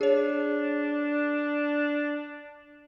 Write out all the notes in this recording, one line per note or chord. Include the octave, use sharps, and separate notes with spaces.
D4 G#4 C#5